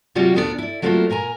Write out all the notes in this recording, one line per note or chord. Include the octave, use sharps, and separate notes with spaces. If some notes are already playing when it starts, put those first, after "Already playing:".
C3 F#3 G3 C4 F4 F#4
D2 A#2 B3 D4 G#4 D5
E4 D5
F#3 A3 A#3 C4 E4 F4
A#2 A#4 G#5 A#5